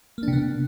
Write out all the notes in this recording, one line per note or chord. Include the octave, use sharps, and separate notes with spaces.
C3 A#3 B3 D4